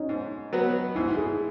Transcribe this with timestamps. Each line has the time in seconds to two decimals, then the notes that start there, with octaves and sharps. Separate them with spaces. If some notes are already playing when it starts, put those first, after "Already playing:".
Already playing: C#4 D#4
0.09 G#2
0.53 F#3 B3 F#4
0.95 G#2 E4
1.17 G#4